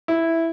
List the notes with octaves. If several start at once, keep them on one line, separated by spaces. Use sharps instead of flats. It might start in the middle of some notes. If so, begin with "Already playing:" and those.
E4